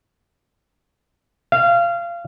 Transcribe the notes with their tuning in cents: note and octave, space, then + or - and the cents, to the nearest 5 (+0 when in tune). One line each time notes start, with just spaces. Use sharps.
F5 -25